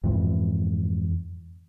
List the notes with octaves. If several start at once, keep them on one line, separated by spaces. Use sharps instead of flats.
F2 G#2 E3